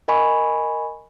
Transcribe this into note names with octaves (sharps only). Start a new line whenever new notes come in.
A#4 D#5 G#5 B5 C#6